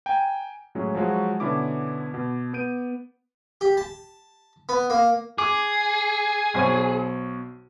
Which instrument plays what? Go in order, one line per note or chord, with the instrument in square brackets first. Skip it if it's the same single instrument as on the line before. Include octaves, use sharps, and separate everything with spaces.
[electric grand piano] G5 G#5 A#5
A2 F#3 G#3 C#4
F3 F#3 G#3 F#4
B2 D3 B3 C#4 E4 D6
B2
B3 G6 D7 D#7
[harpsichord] G4
A5
B3
A#3
[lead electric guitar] G#4 [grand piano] D6
[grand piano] B1 C5 C#5